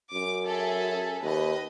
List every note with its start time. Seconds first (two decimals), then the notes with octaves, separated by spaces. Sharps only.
0.13 F#2 D6
0.47 G#4 A4 E5
1.22 D#2 B4 D#5